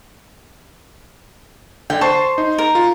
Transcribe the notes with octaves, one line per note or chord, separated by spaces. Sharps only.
D3 G5
C5 A5 C#6 C7
D#4
A#4
F4